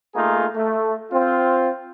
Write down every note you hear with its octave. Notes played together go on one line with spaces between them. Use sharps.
A3 A#3 D#4 F4 G#4
A3
C4 F4